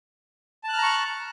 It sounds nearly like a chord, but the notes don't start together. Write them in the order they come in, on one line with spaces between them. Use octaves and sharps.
A5 F#6 F6 A#5 C#6